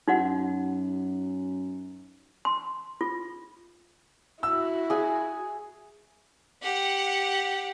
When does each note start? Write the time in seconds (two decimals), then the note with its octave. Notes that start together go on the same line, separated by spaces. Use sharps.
0.08 F#2 D#4 F#4 F#5
2.45 C6
3.01 F4
4.43 E4 F#4 E6
4.90 G#4 G#5
6.63 G4 F#5